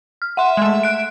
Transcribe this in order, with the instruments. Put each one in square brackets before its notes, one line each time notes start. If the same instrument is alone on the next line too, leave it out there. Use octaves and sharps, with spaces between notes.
[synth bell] F6
[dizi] E5 [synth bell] F#5 C6
[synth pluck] G#3 A3
[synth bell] F#6 D7